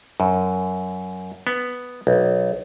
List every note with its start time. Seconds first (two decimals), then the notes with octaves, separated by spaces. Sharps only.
0.20 F#2
1.47 B3
2.07 B1